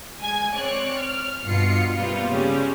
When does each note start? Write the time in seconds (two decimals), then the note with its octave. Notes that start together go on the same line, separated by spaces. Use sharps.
0.20 G#3 G#5 G#6
0.54 C4 C#5 D5 F#6
0.97 F6
1.45 G2 B2 F4 C7 C#7
1.95 C3 G3 A#3 B3 F4
2.29 C#3 G3 G#3 C#4